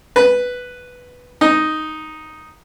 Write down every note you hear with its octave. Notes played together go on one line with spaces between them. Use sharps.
B4
D#4